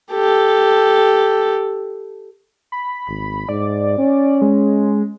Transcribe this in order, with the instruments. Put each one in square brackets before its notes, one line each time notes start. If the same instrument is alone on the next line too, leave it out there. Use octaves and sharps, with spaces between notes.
[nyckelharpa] G4 A4
[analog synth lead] B5
[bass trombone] G#1
[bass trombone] G#2 [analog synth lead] D5
[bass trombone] C#4
[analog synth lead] G#3